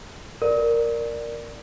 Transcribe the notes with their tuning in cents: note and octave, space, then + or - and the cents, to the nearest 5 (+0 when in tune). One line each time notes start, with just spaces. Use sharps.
A#4 +0 D5 +0